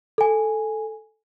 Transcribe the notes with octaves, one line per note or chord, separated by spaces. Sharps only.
A4 G#5